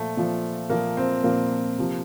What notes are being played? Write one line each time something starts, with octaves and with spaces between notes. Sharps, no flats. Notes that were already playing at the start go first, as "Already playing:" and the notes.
Already playing: A#2 F3 A3
A#2 F3
A#2 F3 A#3
C4
A#2 F3 A#3
C3 F3